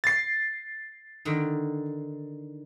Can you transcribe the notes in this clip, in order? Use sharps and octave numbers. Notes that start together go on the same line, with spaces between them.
A6 C7
D3 D#3